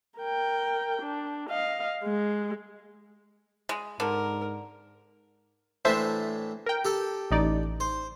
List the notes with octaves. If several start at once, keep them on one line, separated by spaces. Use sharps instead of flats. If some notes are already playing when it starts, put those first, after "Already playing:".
A#4 G5
D4
D#5 F5
G#3
G#3
G#2 D3 A#4
A2 E3 D4 C5 E5 A5
A#4 G5
G4 A4
A1 D#4 D5
C5